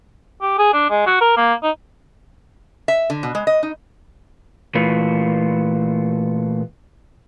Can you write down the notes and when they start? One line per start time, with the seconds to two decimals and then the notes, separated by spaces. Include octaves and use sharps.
0.42 G4
0.58 G#4
0.73 D4
0.90 G#3
1.06 F#4
1.21 A#4
1.37 A#3
1.63 D#4
2.88 E5
3.10 D3
3.23 B2
3.35 G#3
3.47 D#5
3.63 D#4
4.75 A#2 E3 A3 F4 F#4 B4